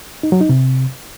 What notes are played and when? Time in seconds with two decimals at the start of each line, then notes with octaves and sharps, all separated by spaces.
0.23 D#4
0.32 F#3
0.41 D#4
0.49 C3